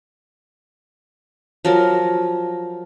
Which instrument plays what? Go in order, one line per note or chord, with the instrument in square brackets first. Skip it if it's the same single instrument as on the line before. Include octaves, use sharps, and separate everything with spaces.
[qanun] F3 F#3 A#4